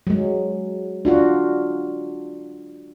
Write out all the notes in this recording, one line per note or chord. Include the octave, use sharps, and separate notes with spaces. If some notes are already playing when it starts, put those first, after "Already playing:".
F#3 G#3
D4 F4 F#4